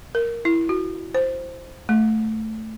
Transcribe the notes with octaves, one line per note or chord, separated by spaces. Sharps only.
A#4
E4
F#4
C5
A3